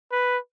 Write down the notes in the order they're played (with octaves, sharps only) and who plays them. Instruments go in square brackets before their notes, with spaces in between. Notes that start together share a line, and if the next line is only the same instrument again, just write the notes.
[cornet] B4